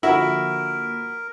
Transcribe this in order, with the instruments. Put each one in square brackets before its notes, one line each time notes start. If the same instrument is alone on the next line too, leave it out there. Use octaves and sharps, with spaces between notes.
[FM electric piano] D3 F3 A#3 [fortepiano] E4 [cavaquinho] F#4 [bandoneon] A#4